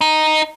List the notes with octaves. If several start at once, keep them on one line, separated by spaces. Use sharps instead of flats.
D#4